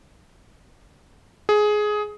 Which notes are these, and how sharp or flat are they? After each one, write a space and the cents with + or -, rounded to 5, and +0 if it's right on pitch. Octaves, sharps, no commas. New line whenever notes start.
G#4 +15